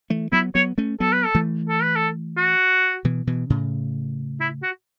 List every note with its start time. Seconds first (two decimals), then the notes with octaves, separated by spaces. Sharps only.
0.10 E3 A3
0.32 F#3 B3 E4
0.55 F#3 B3 C#5
0.78 A3 C#4
1.00 F#3 B3 A4
1.12 B4
1.25 A4
1.35 E3 A3
1.69 A4
1.82 B4
1.95 A4
2.37 F#4
3.05 B2 E3
3.27 B2 E3
3.50 A2 C#3
4.40 E4
4.63 F#4